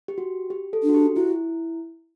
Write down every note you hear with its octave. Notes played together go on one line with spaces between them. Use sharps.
G4
F#4
G4
A4
D4
F#4
G4
E4 F#4